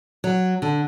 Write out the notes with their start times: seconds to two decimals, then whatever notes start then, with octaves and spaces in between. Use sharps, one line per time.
0.24 F#3
0.62 D3